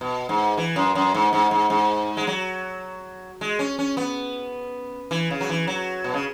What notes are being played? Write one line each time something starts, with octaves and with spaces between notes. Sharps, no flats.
B2
G#2
E3
F#2
F#2
G#2
G#2
G#2
G#2
G#3
F#3
G#3
C#4
C#4
B3
E3
C#3
F#3
E3
F#3
B2
C#3